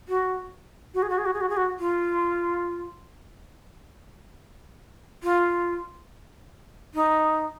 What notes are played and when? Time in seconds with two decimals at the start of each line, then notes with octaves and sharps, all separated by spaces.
0.08 F#4
0.94 F#4
1.03 G#4
1.10 F#4
1.18 G#4
1.26 F#4
1.33 G#4
1.41 F#4
1.49 G#4
1.57 F#4
1.80 F4
5.23 F4
6.94 D#4